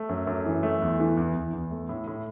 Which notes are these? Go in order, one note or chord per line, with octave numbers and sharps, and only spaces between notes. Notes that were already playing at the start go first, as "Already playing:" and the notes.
Already playing: A3
F#2
F#2
E3
A3
E2
E3
E2
E2
E2
A3
A2
A2